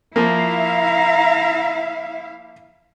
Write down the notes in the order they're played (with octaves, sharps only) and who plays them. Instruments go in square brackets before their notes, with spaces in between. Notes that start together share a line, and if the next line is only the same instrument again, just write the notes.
[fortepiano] F3 A#3 [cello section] E4 E5 F5 [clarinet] A#5